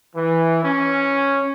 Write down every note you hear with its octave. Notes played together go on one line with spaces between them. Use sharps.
E3
C#4